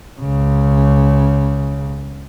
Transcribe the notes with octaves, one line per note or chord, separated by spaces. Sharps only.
C#2 C#3